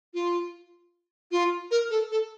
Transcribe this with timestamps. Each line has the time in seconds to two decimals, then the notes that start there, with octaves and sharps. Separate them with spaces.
0.14 F4
1.32 F4
1.71 A#4
1.90 A4
2.11 A4